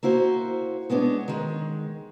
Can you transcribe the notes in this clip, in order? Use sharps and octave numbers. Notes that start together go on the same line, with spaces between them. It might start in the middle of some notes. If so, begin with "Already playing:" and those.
A#3 E4 F#4 C5
G#3 B3 C#4 D4
D#3 G#3